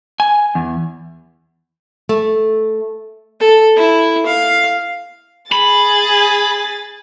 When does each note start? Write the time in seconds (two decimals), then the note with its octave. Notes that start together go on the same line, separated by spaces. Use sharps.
0.20 G#5
0.55 E2
2.09 A3
3.40 A4
3.76 E4
4.26 F5
5.52 G#4 B5 A6